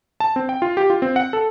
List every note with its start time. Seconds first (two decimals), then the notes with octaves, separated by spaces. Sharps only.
0.20 A5
0.36 C4
0.49 G5
0.62 F4
0.77 G4
0.90 F4
1.02 C4
1.16 F#5
1.33 A4